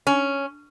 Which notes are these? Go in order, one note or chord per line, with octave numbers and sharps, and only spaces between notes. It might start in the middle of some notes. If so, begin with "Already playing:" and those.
C#4